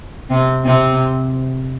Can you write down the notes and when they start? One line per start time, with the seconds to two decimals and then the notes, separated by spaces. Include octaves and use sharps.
0.30 C3 C4
0.65 C3 C4